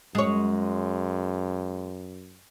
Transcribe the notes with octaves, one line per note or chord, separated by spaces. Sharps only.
F#2 G#3 C#5